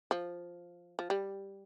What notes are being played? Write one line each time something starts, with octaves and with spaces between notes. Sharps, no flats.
F3
F3
G3